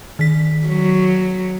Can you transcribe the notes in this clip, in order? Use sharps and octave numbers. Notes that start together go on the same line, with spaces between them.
D#3 B6
F#3